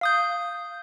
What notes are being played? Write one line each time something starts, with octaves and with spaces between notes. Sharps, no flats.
F5 D#6 G6